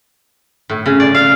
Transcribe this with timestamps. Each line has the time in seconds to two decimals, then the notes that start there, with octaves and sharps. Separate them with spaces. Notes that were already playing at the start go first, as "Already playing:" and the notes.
0.69 A2
0.86 C#3
1.00 D5
1.15 F5